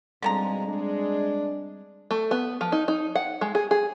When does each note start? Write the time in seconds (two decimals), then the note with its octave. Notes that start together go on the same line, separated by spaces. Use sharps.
0.23 G#2 B2 D3 F3 G3 G#3 C4 A#5
0.67 G#3 D4
2.11 A3
2.31 B3
2.61 F3
2.72 D#4
2.88 D#4
3.15 F#5
3.41 G#3
3.55 G#4
3.71 G#4